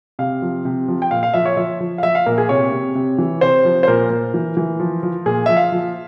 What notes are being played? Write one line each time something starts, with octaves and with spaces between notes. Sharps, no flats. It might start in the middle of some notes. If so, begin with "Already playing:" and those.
C3 F5
F3
C3
F3
G5
A#2 F5
F5
F3 E5
C#5
F3 E5
F3
F5
F3 E5
F5
A#2 A#4
G#4
C3 C#5
C3
C3
E3
C3 C5
F3
C5
A#2 A#4
A#2
E3
E3
F3
F3
A#2 G#4
F3 E5
F5
F3